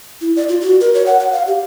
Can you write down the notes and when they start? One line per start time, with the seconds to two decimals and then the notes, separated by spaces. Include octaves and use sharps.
0.21 E4
0.36 D5
0.49 F4
0.61 F#4
0.80 A#4
0.94 C#5
1.06 F#5
1.20 F#5
1.32 F5
1.47 G4